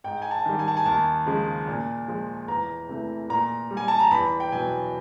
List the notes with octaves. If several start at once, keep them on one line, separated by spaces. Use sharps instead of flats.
G#2 G5
G#5
A5
D#3 G3
G#5
A5
G#5
D#2 A5
C#3 F3 G#3
A#2
F3 G#3
E2 A#5
C3 E3 A3
A#2 A#5
G3
G#5
A5
A#5
E2 B5
G5
B2 F#3 G#5